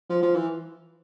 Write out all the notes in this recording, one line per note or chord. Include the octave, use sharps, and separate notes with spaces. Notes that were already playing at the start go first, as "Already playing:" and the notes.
F3
F3
E3